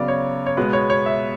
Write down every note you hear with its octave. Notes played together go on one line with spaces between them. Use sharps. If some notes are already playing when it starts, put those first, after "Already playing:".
Already playing: C#3 F#3 B3 D5
C#5
C#5
B2 G#3 B3 B4
C#5
C#5
E5